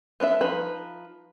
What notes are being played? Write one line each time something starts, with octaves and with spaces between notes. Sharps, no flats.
B3 D4 C#5 E5
F3 D#4 B4